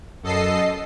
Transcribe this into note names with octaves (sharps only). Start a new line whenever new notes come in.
F#2 A4 D#5 C7